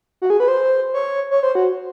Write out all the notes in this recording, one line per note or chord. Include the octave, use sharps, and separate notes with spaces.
F#4
G#4
B4
C5
C#5
C#5
C5
F#4